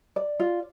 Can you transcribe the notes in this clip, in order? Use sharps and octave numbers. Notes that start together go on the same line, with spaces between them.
D5
F4